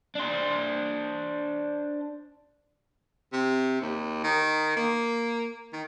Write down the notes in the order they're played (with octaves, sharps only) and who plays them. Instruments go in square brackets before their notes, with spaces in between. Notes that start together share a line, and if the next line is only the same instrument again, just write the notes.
[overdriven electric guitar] D4 C5
[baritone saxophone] C3
D#2
D#3
A#3
D#3